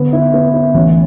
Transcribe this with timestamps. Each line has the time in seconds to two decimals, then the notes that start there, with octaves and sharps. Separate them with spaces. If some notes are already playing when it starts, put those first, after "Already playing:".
Already playing: D3 B3
0.13 E4
0.34 B3
0.54 E4
0.74 A1 E3